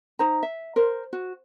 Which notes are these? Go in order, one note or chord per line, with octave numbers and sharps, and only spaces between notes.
D#4 C5 A#5
E5
A#4 C5
F#4